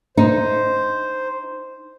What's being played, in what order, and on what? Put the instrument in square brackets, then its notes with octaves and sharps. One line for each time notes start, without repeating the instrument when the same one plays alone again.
[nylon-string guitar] D#4 [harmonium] C5